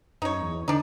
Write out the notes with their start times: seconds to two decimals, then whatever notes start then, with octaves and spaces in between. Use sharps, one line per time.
0.22 F#2 D#4 C#5
0.41 E2
0.68 D3 D4 D#4